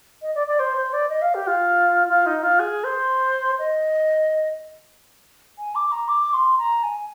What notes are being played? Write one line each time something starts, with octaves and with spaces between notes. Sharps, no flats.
D#5
D5
D5
C5
C5
D5
D#5
F5
G4
F4
F4
D#4
F4
G#4
C5
D#5
G#5
D6
A#5
D6
C6
A#5
G#5